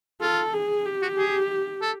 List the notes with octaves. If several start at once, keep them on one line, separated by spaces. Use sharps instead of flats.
F4 A4
G#4
G4
F#4
G#4
A4